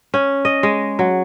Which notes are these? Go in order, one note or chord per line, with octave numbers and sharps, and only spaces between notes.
C#4
D#5
G#3
F#3